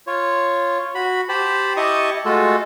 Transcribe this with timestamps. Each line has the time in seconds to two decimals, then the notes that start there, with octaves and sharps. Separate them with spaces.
0.07 F4 C#5
0.95 F#4 B5
1.29 G4 C5 A5 B5
1.77 E4 G4 D#5 A5 C#6 D#6
2.25 G#3 A3 F4 F#4 A4